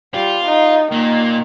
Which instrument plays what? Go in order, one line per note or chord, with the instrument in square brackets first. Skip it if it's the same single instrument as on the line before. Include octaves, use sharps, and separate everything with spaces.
[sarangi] G3 [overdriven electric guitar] F4
[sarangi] D#4
[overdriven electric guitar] A#2 A#3 [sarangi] D#3